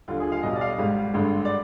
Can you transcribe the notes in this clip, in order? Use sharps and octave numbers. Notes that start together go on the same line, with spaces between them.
D#2 D3 G3 F4
G#4
F5
B1 B2 G3 D#5
D5
F5
D#5
G#1 G#2 G3 F5
G#1 G2 D3 G#3
D5